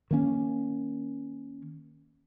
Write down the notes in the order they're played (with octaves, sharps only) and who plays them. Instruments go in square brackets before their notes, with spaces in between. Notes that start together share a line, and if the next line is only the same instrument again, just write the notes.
[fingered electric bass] D#3 A#3 C#4